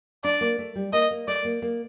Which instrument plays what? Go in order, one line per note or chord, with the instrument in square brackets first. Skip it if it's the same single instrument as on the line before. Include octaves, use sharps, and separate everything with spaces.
[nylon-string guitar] D4 [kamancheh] D5
[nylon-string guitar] A#3
A3
G3
[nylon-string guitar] A#3 [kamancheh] D#5
[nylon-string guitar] A#3
[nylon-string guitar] A3 [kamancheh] D5
[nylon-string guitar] A#3
A#3